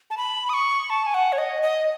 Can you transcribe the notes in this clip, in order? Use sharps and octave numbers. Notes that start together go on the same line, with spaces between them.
A5
B5
D#6
C#6
A5
G#5
F#5
C#5
D#5
D#5